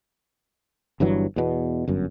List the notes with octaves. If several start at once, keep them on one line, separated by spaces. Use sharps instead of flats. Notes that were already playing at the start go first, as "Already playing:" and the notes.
G1 G2 E3 F#3
E2 B2
G1 F#2